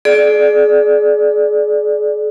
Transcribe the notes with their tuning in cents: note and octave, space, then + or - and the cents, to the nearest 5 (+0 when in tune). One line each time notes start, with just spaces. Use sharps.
G#4 +35 D5 +0